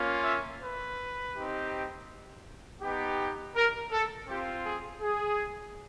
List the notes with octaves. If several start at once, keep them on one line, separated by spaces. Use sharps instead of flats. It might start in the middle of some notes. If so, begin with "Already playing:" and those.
Already playing: A#3 C#4 F4
E5
B4
C4 D#4 G4
B3 D#4 G4
A#4
A4
C4 F4 G4
G#4
G#4